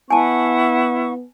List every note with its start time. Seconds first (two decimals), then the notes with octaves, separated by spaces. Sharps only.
0.10 B3 E4 F#5 G#5 A5 C#6